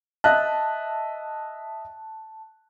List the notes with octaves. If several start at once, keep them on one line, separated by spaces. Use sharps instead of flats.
D#5 E5 A5 F#6